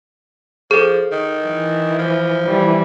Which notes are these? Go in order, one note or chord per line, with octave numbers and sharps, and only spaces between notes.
F3 G#4 A4
D#3
E3
F3
E3 G3